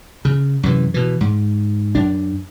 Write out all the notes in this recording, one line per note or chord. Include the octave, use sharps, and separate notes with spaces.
C#3
F#2 C3 E3
B2 E3
G#2
F#2 D4